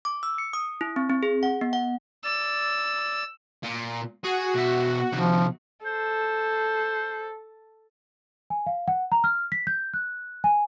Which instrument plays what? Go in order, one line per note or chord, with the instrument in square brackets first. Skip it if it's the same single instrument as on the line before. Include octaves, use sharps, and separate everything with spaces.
[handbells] D6
E6
C#7
D#6
E4
C4
C4
G#4
F#5
B3
F#5
[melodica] D5 [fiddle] E6
[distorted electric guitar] A#2
[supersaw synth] F#4 [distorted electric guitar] G#4
[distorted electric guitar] B2 E5
[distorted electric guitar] C3 D#3 [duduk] F3
[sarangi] A4 [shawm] C5
[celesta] G#5
F5
F#5
A#5
F6
B6
G6
F#6
G#5